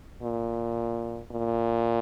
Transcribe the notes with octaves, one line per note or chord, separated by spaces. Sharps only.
A#2
A#2